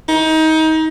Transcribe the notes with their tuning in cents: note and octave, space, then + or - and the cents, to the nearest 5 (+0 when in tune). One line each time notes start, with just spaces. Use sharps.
D#4 +25